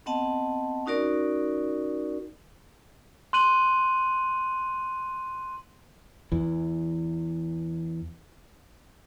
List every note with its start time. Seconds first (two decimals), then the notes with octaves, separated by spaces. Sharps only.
0.06 B3 C4 D#5 F#5 A5
0.86 C#4 D#4 F#4 A#4 D5
3.33 C6 F#6 D#7 F#7
6.32 E2 E3